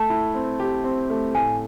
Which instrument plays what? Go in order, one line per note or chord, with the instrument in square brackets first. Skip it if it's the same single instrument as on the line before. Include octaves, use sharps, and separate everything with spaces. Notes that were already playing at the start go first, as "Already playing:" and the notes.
Already playing: [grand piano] A3 [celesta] A5
[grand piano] E4
C4
G4
C4
A3
[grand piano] A2 [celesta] G#5